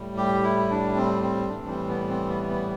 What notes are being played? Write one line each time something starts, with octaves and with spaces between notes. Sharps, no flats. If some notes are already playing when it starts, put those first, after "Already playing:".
Already playing: A2 G3
G4
E4
D4
C4
C4
A2 E3 G3 D4
C4
B3
C4
B3
B3